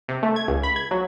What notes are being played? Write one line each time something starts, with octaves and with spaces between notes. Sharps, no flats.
C3
A3
G#6
C#2
B5
G#6
F#3